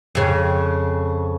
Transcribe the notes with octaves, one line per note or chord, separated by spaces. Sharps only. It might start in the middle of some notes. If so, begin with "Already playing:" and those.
F2 C#3